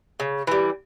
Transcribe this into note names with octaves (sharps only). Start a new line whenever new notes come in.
C#3
E3 G3